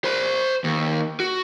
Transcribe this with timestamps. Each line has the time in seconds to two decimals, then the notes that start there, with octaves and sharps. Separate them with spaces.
0.04 C5 B5
0.64 D#2
1.20 F#4